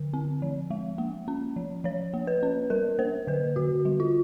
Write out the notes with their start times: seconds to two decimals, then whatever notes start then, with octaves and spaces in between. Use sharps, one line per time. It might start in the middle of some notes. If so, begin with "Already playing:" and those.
Already playing: D3
0.13 C4
0.42 F3
0.70 G#3
0.98 A#3
1.28 C#4
1.56 F3
1.84 F3 C#5
2.14 A#3
2.27 B4
2.43 C#4
2.70 G3 A#4
2.99 A#3 C5
3.27 D3 B4
3.56 D3 F#4
3.85 G3
4.00 F4